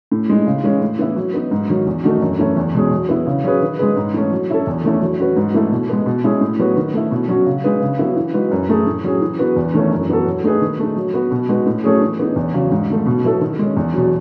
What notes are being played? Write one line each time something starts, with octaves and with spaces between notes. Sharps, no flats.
A2
G#3 D#4
C#3
E3 G#3 C#4
A2
E3 B3 E4
F#3
B3 D#4
G#2
D#3 F#3
E2
D#3 A3 D#4 F#4
F#2
E3 A3 C#4 E4
E2
B2 G#3 C#4 G#4
F#3
B3 E4
C#3
F#3 C#4 G#4 B4
D#3
G#3 D#4 G#4 B4
G#2
E3 A3 C#4
F#3
C#4 E4 A4
E2
D#3 A3 C#4 E4
F#3
C#4 F#4 B4
G#2
E3 A3 E4
B2
G#3 B3
B2
G#3 C#4 E4 G#4
A2
F#3 B3 F#4 B4
D#3
A3 E4
B2
F#3 C#4 F#4
C#3
G#3 D#4 G#4 B4
C#3
F#3 B3 E4
E3
G#3 D#4 F#4 B4
F#2
E3 A3 E4 G#4
A2
F#3 C#4 G#4
E3
B3 F#4 B4
E2
D#3 A3 C#4 E4
F#2
E3 B3 F#4 A4
F#3
A3 D#4 G#4 B4
D#3
A3 D#4
F#3
B3 F#4 B4
B2
G#3 D#4 F#4 B4
A2
F#3 A3 C#4 G#4
E3
B3 D#4
E2
C#3 F#3
G#2
D#3 A3
B2
F#3 B3 E4 A4
D#3
G#3 C#4
E2
B2 F#3